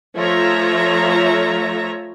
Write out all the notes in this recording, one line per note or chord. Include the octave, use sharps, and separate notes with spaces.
F3 A3 F4 C#5 E5 A#5